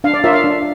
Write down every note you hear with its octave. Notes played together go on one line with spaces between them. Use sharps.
D4 F5
D5
F4 A#4 C#5 E5
F5
D4